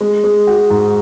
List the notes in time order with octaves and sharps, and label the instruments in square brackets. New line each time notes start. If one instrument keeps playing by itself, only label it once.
[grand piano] G#3
G#3
F#4
G#2